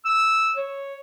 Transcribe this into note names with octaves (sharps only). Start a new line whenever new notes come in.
E6
C#5